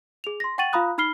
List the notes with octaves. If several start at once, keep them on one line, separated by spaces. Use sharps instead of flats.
G#4 F7
C6 A#6
F#5 G5 C#6 A6 D#7 F#7
F4 F5 A#5 B5 D#6 F#6
D#4 B5 F6 C7 G7